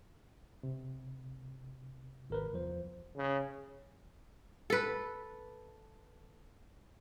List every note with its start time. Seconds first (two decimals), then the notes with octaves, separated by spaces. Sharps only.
0.63 C3
2.30 G#1 A#4 B4
2.53 E2 F3 C5
3.16 C#3
4.70 A4 B4